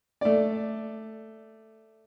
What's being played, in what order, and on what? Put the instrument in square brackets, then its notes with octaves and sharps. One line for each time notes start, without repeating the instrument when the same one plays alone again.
[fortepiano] A3 D5